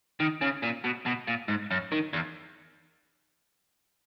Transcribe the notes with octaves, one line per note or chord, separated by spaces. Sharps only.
D#3
C#3
A#2
B2
B2
A#2
G#2
F#2
D#3
E2